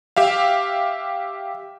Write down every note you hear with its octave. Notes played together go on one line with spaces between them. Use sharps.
G4 E5 F5